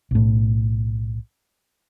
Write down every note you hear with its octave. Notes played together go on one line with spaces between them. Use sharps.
B1 A2